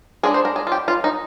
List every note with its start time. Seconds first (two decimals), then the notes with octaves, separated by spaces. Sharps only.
0.23 G#3 D4 G#4
0.34 C5
0.45 A#4
0.56 G#4
0.67 F4
0.72 G4
0.88 F4
1.04 D#4